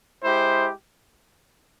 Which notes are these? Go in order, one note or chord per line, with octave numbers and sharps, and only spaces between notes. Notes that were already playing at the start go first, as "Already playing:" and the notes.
G#3 E4 G4 C5